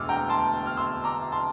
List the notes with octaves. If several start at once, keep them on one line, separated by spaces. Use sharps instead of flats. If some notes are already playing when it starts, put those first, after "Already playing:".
Already playing: E1 D2 D6 E6 F6
G5 A#5
A5 C6
F6
C6 E6
A#5 D6
A5 C6